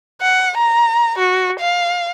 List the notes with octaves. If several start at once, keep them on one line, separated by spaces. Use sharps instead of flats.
F#5
A#5
F#4
F5